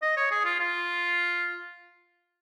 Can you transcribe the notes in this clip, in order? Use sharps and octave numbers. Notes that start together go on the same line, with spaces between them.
D#5
C#5
G#4
F4
F4